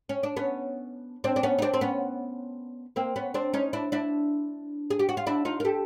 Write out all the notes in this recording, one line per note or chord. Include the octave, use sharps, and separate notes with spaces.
C#4
D4
B3 C#4
C4 D4
D4
B3 C#4
D#4
C4 D4
C4
B3 C#4
A#3 C4
B3 C#4
C4 D4
C#4 D#4
D4 E4
D4 E4
G#4
G4
F#4
F4
D4 E4
D#4 F4
A#4
G4 A4